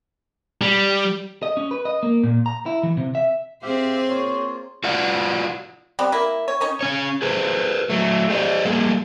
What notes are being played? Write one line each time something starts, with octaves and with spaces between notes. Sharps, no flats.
G3
D#5
C#4
B4
D#5
A#3
A#2
A#5
E4
E3
C3
E5
C4 G4 G#4 C5 E5 F5
A#3 F4 C#5
F4 F#4 D5 F#5
G3 B3 C4
A#3 E4
C#5
C#4 D#4 C#5
C#3 C#4 C#5
G#4 B4 C5
F#3 A3
G4 C5 D5 D#5
G3 A#3 G#4 A4